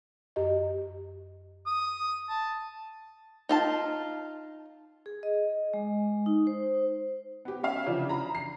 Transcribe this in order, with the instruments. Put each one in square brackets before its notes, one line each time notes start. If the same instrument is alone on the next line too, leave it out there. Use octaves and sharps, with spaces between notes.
[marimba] F#2 G4 D#5
[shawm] D#6
A5
[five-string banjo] D#4 F4 A5
[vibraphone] G#4
D#5
G#3
D#4
C5
[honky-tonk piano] B3 G4
C#4 E5 F5
C#3 E3 F3 D4
A#5 B5
C7